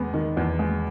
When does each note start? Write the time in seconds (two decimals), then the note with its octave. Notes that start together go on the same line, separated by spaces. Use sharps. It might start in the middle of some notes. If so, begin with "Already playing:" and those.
Already playing: E2 G#3 B3
0.13 D#3
0.37 E2
0.59 G#3